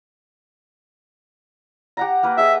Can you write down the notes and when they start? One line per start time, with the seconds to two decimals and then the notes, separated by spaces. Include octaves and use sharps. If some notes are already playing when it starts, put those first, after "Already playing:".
1.97 G4 F#5 A#5
2.23 A#3 A#4 B4
2.38 G#4 D#5 E5